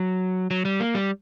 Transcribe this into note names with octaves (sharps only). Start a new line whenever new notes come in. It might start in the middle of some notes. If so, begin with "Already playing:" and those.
Already playing: F#3
F#3
G3
A#3
G3